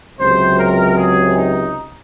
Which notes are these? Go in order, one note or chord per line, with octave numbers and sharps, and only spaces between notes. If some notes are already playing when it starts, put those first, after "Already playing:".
C#2 C3 F#3 C5
A#4
G#4
D#4